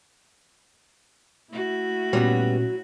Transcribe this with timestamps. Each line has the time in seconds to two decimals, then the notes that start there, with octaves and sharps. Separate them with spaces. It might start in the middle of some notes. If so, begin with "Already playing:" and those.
1.51 A3 E4 F#4
2.13 A#2 F#3 G3 B3 C#4